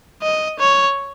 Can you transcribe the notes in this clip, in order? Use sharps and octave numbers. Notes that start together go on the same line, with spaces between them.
D#5
C#5